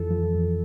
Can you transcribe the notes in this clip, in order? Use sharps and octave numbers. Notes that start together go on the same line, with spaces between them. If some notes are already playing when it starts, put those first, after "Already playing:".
Already playing: F2 E3 A4
F3
F2